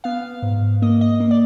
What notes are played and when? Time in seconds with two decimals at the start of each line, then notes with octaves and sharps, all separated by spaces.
0.04 B3 F5
0.43 G#2
0.82 A#3 D#5
1.01 D#5
1.20 A#3
1.31 D5